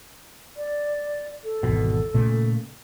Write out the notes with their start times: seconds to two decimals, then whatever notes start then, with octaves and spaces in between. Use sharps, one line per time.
0.57 D5
1.44 A4
1.63 G#1 E2 B2
2.14 A#2 C#3 A3